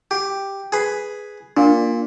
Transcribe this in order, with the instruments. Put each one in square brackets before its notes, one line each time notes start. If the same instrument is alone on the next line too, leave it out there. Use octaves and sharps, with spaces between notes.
[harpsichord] G4
G#4 B4
[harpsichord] A#2 [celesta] D4